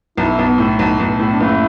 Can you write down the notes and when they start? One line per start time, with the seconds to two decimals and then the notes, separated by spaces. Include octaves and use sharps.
0.18 B1 E4
0.38 B1 B3
0.58 A2
0.79 B1
0.99 B1
1.19 A2 B3
1.31 D4
1.40 F#1 E4